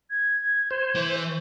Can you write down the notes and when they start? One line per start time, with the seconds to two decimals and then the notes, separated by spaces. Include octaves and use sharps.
0.10 G#6
0.71 C5
0.95 E3